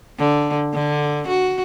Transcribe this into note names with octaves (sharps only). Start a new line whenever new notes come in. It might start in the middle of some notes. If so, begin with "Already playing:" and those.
D3
D3
F#4